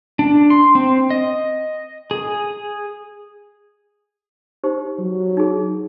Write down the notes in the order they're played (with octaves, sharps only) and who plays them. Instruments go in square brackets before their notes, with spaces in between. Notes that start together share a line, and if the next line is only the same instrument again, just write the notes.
[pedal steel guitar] D4
C6
C4
D#5
G#4
[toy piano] D#4 G4 C5
[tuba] F#3
[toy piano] D#4 G#4